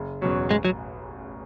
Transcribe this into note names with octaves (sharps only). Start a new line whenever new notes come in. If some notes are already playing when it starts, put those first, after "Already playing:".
Already playing: F#1
E2 B2 F#3 C#4
A1 G#3
F#3